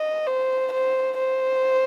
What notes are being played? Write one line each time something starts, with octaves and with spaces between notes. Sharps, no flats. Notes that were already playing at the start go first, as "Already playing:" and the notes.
Already playing: D#5
C5
C5
C5